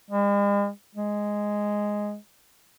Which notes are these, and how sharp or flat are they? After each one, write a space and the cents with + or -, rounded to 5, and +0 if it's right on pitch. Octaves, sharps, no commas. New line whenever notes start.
G#3 -45
G#3 -5